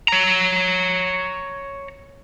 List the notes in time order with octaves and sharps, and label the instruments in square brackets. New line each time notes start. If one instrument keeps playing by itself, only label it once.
[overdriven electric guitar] C#5 A#5